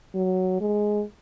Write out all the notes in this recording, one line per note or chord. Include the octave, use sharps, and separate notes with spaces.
F#3
G#3